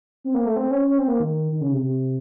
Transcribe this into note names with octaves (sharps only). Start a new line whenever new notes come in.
C4
A#3
A3
C4
C#4
C#4
C4
A#3
D#3
D#3
C#3
C3
C3